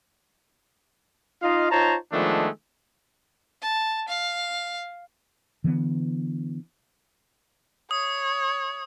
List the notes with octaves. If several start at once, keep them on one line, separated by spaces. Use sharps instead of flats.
D#4 F4 D#5 F5
D#4 F4 C5 C#5 A5 A#5
D#3 F3 G#3 A3 B3 D4
A5
F5
D3 E3 G#3 B3
C#5 D#6